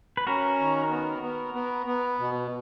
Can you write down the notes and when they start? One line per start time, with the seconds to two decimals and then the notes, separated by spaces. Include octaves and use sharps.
0.17 B4
0.27 C#4 F#4 A#4
0.59 D#3
0.90 B3
1.22 B3
1.54 B3
1.86 B3
2.19 B2